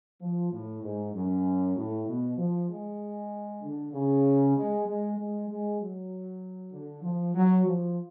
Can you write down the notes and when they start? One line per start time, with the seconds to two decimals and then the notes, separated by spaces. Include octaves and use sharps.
0.20 F3
0.51 A2
0.82 G#2
1.13 F#2
1.76 A2
2.06 B2
2.37 F3
2.68 G#3
3.61 D3
3.92 C#3
4.55 G#3
4.86 G#3
5.16 G#3
5.48 G#3
5.79 F#3
6.71 D3
7.02 F3
7.34 F#3
7.65 F3